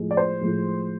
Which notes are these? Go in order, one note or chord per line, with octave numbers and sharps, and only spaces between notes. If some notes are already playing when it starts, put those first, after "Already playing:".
Already playing: A2 F3 G#3
D5
C5
A2 F3 G#3